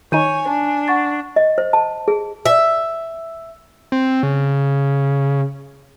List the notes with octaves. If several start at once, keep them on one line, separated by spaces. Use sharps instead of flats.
D#3 D#4 C#5 G#5 G6 D#7
D4 A5
F#5 C#6 A6
D#5
C5
A5
G#4
E5
C4
C#3